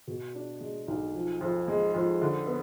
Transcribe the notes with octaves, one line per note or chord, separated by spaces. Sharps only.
B2
D4
G#3
B1
F3
F2
G#3
F2
D3
B3